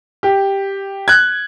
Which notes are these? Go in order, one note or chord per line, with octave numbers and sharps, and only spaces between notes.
G4
F#6 G#6